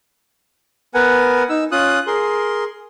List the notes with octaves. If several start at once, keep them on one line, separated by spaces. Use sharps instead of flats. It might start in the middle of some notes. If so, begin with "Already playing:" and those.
B3 A#4 B4 F#5 G#5
D#4 E6
C#4 F4 D#6 F#6
G#4 A#4 C6